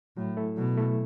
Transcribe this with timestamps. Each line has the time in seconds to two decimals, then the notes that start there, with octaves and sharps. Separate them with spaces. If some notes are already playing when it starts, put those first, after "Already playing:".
0.17 A2 F#3
0.37 A3 E4 A4
0.57 B2 F#3
0.77 A3 E4 A4